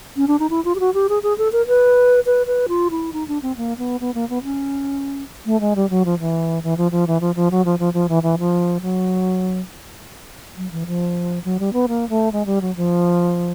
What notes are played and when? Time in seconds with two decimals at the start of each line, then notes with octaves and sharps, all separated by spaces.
0.16 C#4
0.27 D4
0.39 D#4
0.50 E4
0.65 F4
0.75 G4
0.80 F#4
0.94 G4
1.09 G#4
1.23 G#4
1.38 A4
1.52 A#4
1.67 B4
2.26 B4
2.46 B4
2.68 F4
2.91 E4
3.13 D#4
3.28 D4
3.42 C4
3.57 A#3
3.78 B3
4.00 B3
4.14 A#3
4.29 B3
4.44 C#4
5.46 A3
5.60 G#3
5.76 G3
5.90 F#3
6.05 F3
6.20 E3
6.63 E3
6.77 F3
6.91 F3
7.07 E3
7.21 F3
7.35 F3
7.51 F#3
7.65 F3
7.79 F3
7.93 F3
8.09 E3
8.23 E3
8.38 F3
8.81 F#3
10.57 F#3
10.71 E3
10.86 F3
11.44 F#3
11.59 G3
11.73 B3
11.88 A#3
12.09 A3
12.32 G#3
12.46 G3
12.61 F#3
12.76 F3